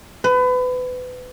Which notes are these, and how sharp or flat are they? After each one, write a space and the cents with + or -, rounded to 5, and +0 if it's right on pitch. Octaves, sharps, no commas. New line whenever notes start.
B4 +30